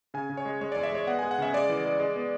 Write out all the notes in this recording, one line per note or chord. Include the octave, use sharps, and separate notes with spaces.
C#3 G#5
C#3
C#5
G#3
G#3 C#5
E2 D5
E5
G#3 C#5
B3 F#5
G#3 G#5
F#5
C#3 E5
G#3 D5
E3
G#3
G#3
B3